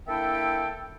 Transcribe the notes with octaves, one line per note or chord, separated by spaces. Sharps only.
A#3 D4 E4 A4 E5 G5